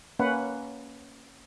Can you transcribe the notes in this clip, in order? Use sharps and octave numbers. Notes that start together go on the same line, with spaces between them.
A#3 C#4 B4 F#5